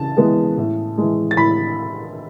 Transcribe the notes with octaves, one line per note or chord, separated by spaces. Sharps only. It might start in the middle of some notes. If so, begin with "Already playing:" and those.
Already playing: C#3 E3 A5 A6
E3 G#3 B3
A2
E3 G#3
A6
A2 B5 B6